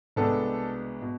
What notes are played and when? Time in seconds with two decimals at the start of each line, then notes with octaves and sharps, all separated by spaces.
0.16 C2 B2 G#3 B3 D4 A4
1.02 B2